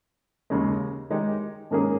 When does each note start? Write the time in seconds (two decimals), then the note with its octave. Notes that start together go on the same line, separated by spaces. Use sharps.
0.50 D#2 C#3 G#3
1.10 D#3 G#3 D#4 G4
1.71 G#2 D#3 A#3 C#4 G#4